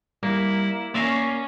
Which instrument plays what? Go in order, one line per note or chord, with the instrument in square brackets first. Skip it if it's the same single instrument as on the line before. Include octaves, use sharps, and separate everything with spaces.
[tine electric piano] G3 [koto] A#3 [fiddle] E4
[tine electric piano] A#3 A#6 C7 [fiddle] C#4 C#5 [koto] D5 E5 F5